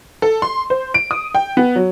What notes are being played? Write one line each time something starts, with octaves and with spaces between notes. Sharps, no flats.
A4
C6
C5
D7
D#6
G5
B3
F#3